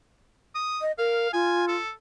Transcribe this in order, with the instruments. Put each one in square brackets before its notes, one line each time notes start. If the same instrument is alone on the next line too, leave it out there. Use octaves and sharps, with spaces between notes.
[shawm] D#6
[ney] D#5
[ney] A#4 [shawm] F5
[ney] F4 [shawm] G#5
[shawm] A4